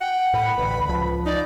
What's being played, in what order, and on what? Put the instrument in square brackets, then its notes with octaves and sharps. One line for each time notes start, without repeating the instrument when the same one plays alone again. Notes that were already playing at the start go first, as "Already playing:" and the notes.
[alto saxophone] F#5 [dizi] G5
[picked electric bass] A2 [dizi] B5
[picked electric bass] A1 D2 [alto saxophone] B4
[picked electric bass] C#2 F3
[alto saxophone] D#4 [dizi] D5